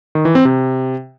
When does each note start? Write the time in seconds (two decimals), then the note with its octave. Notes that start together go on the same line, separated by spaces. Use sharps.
0.15 D#3
0.25 E3
0.35 C4
0.45 C3